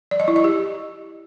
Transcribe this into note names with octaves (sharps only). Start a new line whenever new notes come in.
D5
D#5
E4
D#5
G4